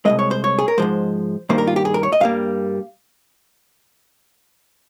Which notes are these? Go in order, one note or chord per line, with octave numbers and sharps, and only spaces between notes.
C2 A#2 G#3 D#5
C#5
C5
C#5
G#4
A#4
G#2 F3 G#3 C5
G2 D#3 G3 A#3 C5
A#4
F4
G4
G#4
A#4
C#5
D#5
G2 G3 A#3 F5